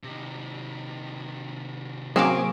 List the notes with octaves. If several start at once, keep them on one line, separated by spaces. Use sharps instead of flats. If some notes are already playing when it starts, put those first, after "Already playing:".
C3 D#3
F#3 A#3 C4 C#4 G#4 C#6 D6